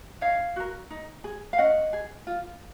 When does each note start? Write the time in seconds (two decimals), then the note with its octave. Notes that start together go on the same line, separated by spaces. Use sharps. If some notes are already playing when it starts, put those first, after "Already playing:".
0.21 D#4 C#5 F5
0.56 F#4 A#4
0.90 D#4
1.24 G#4
1.53 F5
1.58 C#4 D#5 F#5
1.93 G#4
2.27 F4